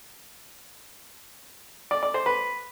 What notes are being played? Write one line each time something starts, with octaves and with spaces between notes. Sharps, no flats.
D5
D5
C5
B4